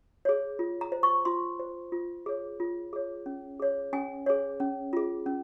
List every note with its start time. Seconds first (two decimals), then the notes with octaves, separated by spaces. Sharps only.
0.25 G#4 C#5
0.59 F4
0.81 A#5
0.92 C5
1.03 C#6
1.25 F4 C6
1.59 C5
1.92 F4
2.26 G#4 C#5
2.60 F4
2.93 G#4 C#5
3.26 C#4
3.60 G#4 C#5
3.93 C#4 G#5
4.26 G#4 C#5
4.60 C#4
4.93 F4 G#4
5.26 C#4